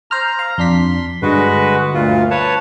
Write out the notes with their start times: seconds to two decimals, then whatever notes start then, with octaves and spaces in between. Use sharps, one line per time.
0.11 C5 A#5 F6
0.39 F5
0.58 F2 D4 C6 B6
1.22 G2 D3 G#3 F#4 B4
1.94 D2 A#2 F4
2.31 B4 C#5 A5